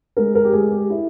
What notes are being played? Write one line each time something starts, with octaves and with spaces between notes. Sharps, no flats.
G#3 A#4
A#4
G4
G#3 G#4
G4
E4